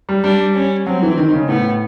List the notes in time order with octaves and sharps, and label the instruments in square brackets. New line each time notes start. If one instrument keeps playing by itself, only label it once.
[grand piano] G3
[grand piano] G3 [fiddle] D4
[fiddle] C#4
[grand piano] F#3 [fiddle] C4
[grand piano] E3
D#3
C#3
[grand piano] A2 [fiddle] B3